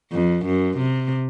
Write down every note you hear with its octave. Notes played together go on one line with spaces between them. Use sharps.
F2
F#2
C3